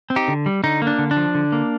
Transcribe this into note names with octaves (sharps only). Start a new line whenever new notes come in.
C4
D#4 G4
D3
G3
D3 D#4
A#3
D4
D3
D4
F3
D3
A#3